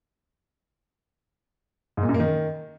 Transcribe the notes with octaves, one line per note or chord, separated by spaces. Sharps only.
G#2
A#2
F#2
A#3
D#3